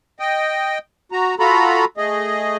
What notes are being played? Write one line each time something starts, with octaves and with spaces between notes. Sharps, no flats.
D#5 G5
F#4 A#5
F4 F#4 A4 A#5 B5
A3 G#4 D#5